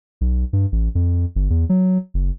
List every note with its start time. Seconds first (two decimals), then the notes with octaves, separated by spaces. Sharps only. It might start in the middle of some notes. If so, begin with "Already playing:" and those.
0.21 B1
0.53 G2
0.72 A1
0.95 F2
1.36 G1
1.50 E2
1.69 F#3
2.14 F#1